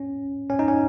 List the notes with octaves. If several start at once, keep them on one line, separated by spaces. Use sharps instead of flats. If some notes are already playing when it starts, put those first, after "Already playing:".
Already playing: C#4
C#4
D#4
C#4